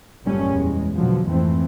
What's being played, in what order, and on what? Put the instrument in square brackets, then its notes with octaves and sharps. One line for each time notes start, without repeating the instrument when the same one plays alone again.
[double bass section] F#1 F#2 A#2 G3 A3 C#4
E2 G#3
B2 D3 F3 F#3
F2 G#2 E3 A3 C4